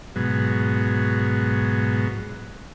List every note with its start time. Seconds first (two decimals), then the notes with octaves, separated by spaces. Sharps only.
0.16 G#2 B2 F#3